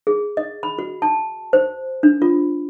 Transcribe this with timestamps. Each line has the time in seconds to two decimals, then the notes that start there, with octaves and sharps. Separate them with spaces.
0.07 G#4
0.37 D#5
0.63 B5
0.79 F#4
1.02 A5
1.53 C5
2.03 D4
2.22 F4